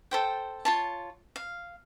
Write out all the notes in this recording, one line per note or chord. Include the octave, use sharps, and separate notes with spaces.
A4 C5 G5
F4 C#5 A5
F5